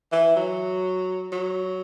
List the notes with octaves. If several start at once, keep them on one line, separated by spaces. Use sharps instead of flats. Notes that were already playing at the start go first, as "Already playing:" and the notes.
E3
F#3
F#3